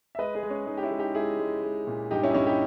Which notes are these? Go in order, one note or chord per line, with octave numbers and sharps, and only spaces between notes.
E5
G#3 B4 D#5
G#4 B4
G#3
C#4
G#3 D#4
G4
C#4 E4
G#3
D#4 G4
G#3 E4 G#4
G#3
G#3
A#2
G2 D#4 G4
C#4 E4
D#4
G2 C#4 E4
D#4 G4